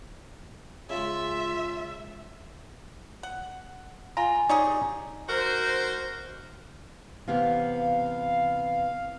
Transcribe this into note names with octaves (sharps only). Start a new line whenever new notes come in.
C#3 G#3 F4 E5
F#5
F4 G#5 A#5
G3 C#4 D#4 G#4 C#5 D5
D#4 F#4 A#4 C5
C3 E3 B3 F5